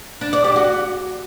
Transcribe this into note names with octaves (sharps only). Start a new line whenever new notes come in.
D4
D5
G4
F#4